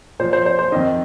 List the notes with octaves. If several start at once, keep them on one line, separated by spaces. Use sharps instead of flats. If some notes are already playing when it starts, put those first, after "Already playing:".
A#2 F3 C5
C5
C5
C5
F2 D#3 D#5